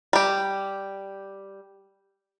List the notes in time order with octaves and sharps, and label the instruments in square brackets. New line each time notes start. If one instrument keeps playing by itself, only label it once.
[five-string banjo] G3 G4